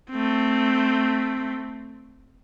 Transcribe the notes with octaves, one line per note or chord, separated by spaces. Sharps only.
A3 C4